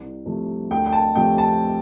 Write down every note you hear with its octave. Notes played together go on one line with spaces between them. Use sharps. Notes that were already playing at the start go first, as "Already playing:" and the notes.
Already playing: C2
C3 F3 A3
D2 G5
G5
A5
C3 F3 A3 G5
A5